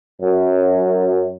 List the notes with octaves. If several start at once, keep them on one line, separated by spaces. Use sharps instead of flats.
F#2